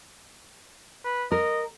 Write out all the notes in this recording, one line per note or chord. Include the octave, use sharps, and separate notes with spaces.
B4
A#4 D#5